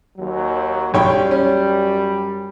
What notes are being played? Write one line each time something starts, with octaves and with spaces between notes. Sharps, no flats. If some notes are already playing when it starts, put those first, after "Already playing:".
D#2 F#3
B1 F#2 G3 C#5 G5
C#4